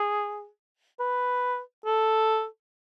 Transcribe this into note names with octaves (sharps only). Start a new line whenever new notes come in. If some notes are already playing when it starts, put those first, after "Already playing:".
Already playing: G#4
B4
A4